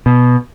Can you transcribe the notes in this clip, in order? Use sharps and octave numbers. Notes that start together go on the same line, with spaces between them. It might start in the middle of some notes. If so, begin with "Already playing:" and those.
B2